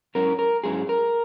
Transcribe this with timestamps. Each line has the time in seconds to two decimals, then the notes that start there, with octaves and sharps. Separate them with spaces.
0.15 G#2 F#3 C#4 E4 A#4
0.39 A#4
0.64 G#2 F#3 C#4 E4 G#4
0.89 A#4